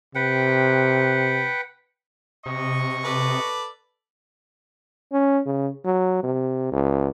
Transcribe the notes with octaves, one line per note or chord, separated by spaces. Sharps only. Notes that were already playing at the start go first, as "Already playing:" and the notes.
C3 B4 F#5 G5
C3 D#5 C#6
A4 B4 D5
C#4
C#3
F#3
C3
C#2